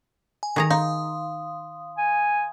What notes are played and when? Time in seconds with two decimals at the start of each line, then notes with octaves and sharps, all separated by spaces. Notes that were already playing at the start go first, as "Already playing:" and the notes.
0.43 G#5
0.56 D#3 G#4 A#5
0.70 D#4 F5 C6 D#6
1.98 G#5